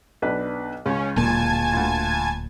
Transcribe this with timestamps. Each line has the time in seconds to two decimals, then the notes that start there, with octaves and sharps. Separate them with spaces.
0.22 B1 D4 B4
0.86 C#2 C#4
1.16 D1 A#2 G#5 A5 G#6
1.73 D2 F4